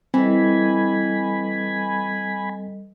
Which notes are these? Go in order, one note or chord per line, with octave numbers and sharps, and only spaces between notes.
E3 G3 C4 A4 D#5 G#5 B5